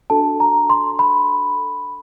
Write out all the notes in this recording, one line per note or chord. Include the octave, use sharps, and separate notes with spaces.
D4 F#4 A4 A5
A#5
C6
B5